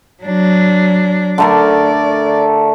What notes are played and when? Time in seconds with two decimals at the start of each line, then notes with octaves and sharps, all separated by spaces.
0.23 F#3 D4
1.38 D3 A3 A#4 D5